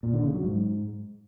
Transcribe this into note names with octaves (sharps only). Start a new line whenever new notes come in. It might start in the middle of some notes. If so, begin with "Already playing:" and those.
A#2
D3
C#3
F#3
G#2